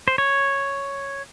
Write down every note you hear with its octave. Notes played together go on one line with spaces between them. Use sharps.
C5
C#5